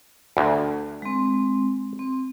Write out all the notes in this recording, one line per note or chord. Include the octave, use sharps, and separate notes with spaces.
D2
G#3 C4
C4